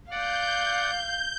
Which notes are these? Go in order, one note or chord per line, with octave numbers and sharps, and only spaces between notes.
D5 F5 F#5 G6